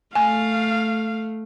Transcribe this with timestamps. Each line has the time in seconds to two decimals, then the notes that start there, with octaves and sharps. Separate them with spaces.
0.15 A3 F5 G#5